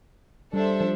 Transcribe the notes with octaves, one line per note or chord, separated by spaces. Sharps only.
G3 D4 A4 C5 E5
F3